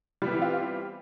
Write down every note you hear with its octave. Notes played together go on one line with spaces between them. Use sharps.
E3 G3 B3 C4 F4